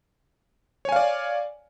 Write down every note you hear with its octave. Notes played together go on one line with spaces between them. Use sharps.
C#5 D5 F5 G#5